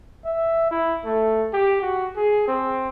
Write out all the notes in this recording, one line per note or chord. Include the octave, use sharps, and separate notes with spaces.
E5
E4
A3
G4
F#4
G#4
C4